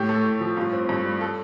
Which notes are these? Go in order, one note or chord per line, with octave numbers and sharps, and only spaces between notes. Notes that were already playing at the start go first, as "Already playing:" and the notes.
Already playing: A2 G4
A3
A2
F3
G2 F4
C4
G2
G3
A4